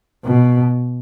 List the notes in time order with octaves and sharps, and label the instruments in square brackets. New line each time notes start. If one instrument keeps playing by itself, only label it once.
[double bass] B2